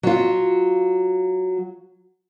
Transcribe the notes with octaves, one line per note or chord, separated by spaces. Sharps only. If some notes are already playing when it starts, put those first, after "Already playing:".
F#3 F4